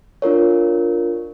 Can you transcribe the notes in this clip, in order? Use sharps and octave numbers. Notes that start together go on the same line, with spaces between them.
D4 F4 A#4 C#5